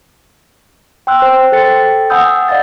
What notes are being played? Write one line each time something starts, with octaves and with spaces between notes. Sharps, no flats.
G5 C6 E6 F#6
C5
A4 G5 A6 C#7
F#5 G#5 B5 D#6 E6 G6
D5 D#5 F5 F#5 A6